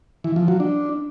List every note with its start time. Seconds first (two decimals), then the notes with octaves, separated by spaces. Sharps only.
0.24 E3
0.36 F3
0.48 F#3
0.60 D4